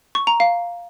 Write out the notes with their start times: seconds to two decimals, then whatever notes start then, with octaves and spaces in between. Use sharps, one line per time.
0.15 C#6
0.27 A#5
0.40 F5